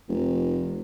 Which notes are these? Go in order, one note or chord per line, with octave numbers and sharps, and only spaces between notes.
F1